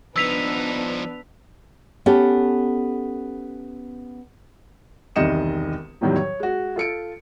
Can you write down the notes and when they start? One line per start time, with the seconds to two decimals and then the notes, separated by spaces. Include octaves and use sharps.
0.16 F3 B3 D4 D#4 B4 E6 B6 F7
2.06 B3 C#4 G4 A4
5.16 E1 C2 D#3 D#5 C#7 E7
6.01 E2 A2 D#3 F#3 G3
6.16 C#5
6.40 G#3 F#4
6.76 F4 A4 C#7 D7